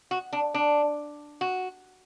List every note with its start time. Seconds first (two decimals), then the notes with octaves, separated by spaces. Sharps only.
0.11 F#4
0.33 D4
0.54 D4
1.41 F#4